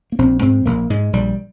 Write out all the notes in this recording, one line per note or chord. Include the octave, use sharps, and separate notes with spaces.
A#3
A#1 C4
G#2 C4
A#1 A#3
G#2 G#3
A#1 G3